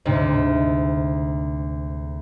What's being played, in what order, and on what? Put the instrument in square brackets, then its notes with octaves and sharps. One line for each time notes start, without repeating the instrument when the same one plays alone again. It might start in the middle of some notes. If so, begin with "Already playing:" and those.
[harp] D2 G#2 C3